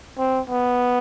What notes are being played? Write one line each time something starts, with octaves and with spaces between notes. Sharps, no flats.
C4
B3